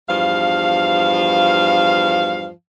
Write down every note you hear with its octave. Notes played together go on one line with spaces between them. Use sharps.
E2 G2 F3 F5